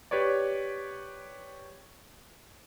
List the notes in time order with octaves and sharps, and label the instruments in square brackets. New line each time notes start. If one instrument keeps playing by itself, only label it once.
[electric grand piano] G4 B4 C#5 D5